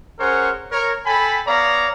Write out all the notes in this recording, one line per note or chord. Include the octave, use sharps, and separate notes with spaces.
C#4 G#4 A#4 C5 C#5 F#5
A#4 C#5
A4 G5 G#5 B5
B3 C#5 D5 F5 A#5